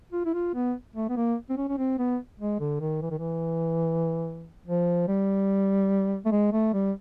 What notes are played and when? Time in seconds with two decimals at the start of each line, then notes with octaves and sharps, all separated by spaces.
0.13 F4
0.25 E4
0.34 F4
0.55 B3
0.96 A3
1.09 B3
1.17 A#3
1.50 C4
1.57 C#4
1.68 C#4
1.78 C4
1.99 B3
2.39 G#3
2.60 D3
2.80 D#3
3.02 E3
3.10 D#3
3.19 E3
4.66 F3
5.08 G3
6.25 A3
6.32 G#3
6.52 A3
6.73 G3